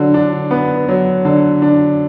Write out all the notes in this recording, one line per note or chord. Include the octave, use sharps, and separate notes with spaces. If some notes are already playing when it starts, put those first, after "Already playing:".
Already playing: D3 F#3
D4
B3
F#3
D3
D4